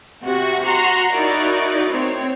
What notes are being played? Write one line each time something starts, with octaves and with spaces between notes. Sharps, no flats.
C3 F#4
F#4 A#5 C6
D#4 E4 F#4 A#4 D5
C4 C#5